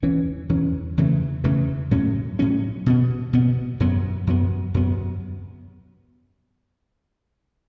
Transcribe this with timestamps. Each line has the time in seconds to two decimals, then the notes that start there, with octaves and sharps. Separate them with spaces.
0.02 E2 E3 C#4
0.49 E2 E3 C#4
0.97 E2 C#3 E3 A3
1.44 E2 C#3 E3 A3
1.91 A2 F#3 C#4
2.39 A2 F#3 C#4
2.86 B2 B3
3.33 B2 B3
3.80 F#2 F#3 B3
4.27 F#2 F#3 B3
4.74 F#2 F#3 B3